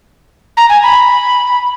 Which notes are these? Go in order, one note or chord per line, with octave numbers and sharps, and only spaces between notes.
A#5
G#5
B5